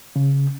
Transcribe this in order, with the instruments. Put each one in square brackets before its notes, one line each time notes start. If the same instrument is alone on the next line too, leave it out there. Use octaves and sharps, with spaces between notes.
[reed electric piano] C#3